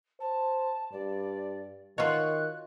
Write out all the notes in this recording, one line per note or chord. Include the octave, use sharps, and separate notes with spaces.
C5 A5
G2 D5
D#3 F4 F#4 C#5 D#5 C6 F#6